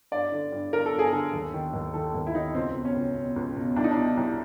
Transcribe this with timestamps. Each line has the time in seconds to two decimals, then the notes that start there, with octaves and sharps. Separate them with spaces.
0.12 G2 D5
0.32 D3
0.52 G2
0.72 D3 A#4
0.86 A4
0.93 G2
0.99 G#4
1.13 D3 A4
1.33 D#2
1.54 D#3
1.74 D#2
1.94 D#3 A4
2.15 D#2
2.27 E4
2.34 D#3 D#4
2.54 C#2 C4
2.75 B2
2.85 C#4
2.95 C#2
3.15 B2
3.36 C#2
3.56 B2
3.76 C2 D4
3.84 D#4
3.91 D4
3.97 B2
4.17 C2